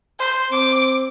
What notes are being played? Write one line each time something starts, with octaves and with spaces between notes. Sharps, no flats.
C5
C4 D6